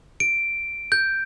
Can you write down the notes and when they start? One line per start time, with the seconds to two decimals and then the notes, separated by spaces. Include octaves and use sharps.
0.20 D7
0.92 G6